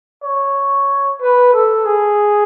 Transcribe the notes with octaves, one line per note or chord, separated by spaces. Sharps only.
C#5
B4
A4
G#4